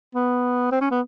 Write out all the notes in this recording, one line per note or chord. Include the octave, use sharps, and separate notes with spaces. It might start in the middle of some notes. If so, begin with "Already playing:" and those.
B3
C4
C#4
B3